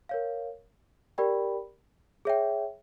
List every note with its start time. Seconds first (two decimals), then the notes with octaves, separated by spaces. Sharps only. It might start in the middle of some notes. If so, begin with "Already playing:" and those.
0.09 A#4 C#5 F5
1.18 G4 A#4 D5 G5 B5
2.25 G#4 C#5 E5 G5